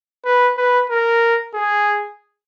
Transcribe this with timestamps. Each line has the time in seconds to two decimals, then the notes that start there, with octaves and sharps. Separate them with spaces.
0.25 B4
0.57 B4
0.90 A#4
1.54 G#4